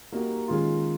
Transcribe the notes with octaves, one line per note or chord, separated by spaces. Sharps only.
G3 A#3 D#4 F#4
D#3 G#3 C#4 F4